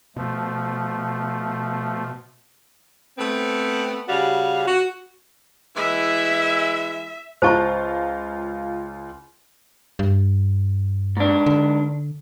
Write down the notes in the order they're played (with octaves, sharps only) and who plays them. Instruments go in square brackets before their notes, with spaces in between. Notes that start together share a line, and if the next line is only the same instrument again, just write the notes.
[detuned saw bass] B2 [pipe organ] F3 A3
[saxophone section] A3 B3 C4
C#3 G3 F#4 F5
F#4
[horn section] E3 G#3 E4 [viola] E5
[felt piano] C#2 F4 A#5 [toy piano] C5 A5 C#6
[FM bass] G2
[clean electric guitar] G#2 D4
[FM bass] D3